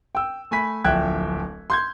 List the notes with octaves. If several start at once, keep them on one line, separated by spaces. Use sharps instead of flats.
G5 E6
A3 G#5 B5 B6
D1 A#1 E5 G5 F#6 G#6
C6 G6 G#6